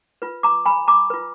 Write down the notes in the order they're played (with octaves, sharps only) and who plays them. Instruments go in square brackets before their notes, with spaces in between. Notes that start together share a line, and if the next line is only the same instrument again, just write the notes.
[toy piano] F4 B4
A#5 D6
G#5 B5
A#5 D6
F4 B4